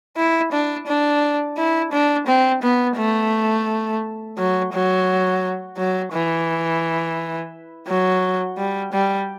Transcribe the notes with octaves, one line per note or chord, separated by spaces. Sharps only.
E4
D4
D4
E4
D4
C4
B3
A3
F#3
F#3
F#3
E3
F#3
G3
G3